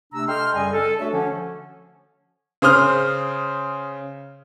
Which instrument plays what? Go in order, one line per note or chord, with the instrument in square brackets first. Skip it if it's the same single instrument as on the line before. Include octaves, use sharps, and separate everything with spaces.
[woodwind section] C3 A3 D4 A#5 E6
A4 D#5 G5 C6 F6
F#2 C#3 G3 D#5 G#5
A4
A3 D4 F#4 C#5 E5
D3 F3 C#4
[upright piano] C#3 C5 D#6 F6